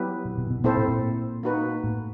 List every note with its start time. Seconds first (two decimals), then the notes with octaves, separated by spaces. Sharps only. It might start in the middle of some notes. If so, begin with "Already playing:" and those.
Already playing: F#3 B3 E4 G4 B4
0.25 B2
0.38 B2
0.50 B2
0.64 A#2 C4 E4 A4 C5
0.77 A2
0.88 A#2
1.43 A#3 D#4 F#4 B4
1.84 A2